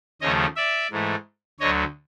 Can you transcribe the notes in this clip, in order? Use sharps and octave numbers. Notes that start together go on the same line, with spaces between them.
D#2 C#3 F3 A3 C#4 C#5 D#5
D5 E5
G#2 E3 A3
D2 D3 F#3 C#5 D#5